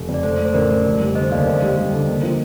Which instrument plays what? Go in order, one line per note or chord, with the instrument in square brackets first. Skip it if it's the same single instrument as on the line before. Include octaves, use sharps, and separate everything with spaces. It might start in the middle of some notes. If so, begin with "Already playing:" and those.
Already playing: [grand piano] F1
F2
[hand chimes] D5
[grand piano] A3 [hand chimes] A4 C5
[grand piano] A3
[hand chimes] C5
[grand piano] A1 [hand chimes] A#4 D5
[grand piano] A3
F1
G3
[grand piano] D3 [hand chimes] C5 D#5
[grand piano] D#2 [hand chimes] D5 F5
[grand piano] F1 [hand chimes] C5 D#5
[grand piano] G3
G3
D3
A#3
F3